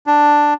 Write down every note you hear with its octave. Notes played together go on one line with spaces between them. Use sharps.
D4